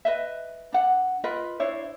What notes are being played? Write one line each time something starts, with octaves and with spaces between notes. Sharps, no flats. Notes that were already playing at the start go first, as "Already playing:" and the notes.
B4 D#5 E5
D4 F#5
F4 A#4 B4 D#5
D4 E4 C5 C#5